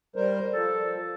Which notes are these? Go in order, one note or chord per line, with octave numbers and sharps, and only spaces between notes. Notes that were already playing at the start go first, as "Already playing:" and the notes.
G3 A#4 C5
F3 A4